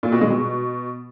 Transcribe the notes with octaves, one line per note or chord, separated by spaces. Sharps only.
A#2
B2
G#3
B2